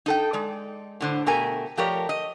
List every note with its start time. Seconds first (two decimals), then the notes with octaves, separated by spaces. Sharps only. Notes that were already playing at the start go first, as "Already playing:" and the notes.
0.06 D#4 A4 G5
0.33 G#3 D5
1.01 A2 D3 C5
1.26 B2 A3 G4 A#4 G#5
1.77 F3 A3 G4 A#4 C#5 D5
2.09 D#5